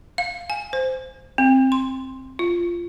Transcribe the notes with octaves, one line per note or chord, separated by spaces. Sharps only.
F5
G#5
C5
C4
C6
F4